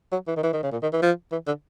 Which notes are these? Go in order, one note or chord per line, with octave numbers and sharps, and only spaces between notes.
F#3
E3
D#3
E3
D#3
C#3
A#2
D#3
E3
F3
E3
D3